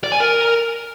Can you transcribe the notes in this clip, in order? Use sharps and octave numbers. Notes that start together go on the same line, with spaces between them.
D5
G#5
A#4